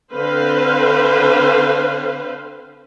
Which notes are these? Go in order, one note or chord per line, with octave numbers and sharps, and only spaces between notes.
D3 C4 B4 C5 F5